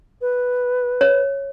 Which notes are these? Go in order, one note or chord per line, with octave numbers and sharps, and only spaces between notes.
B4
C#5